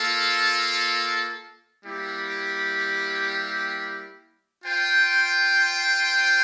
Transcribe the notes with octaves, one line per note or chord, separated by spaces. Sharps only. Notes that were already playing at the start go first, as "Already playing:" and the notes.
Already playing: A#3 F4 A4
G3 A#3 E4 G4
F4 C5 G5